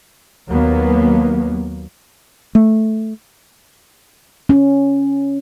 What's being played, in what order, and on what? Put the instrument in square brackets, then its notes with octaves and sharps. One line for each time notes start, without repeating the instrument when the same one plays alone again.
[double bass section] D#2 F#3 A#3 B3
[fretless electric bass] A3
[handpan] C#4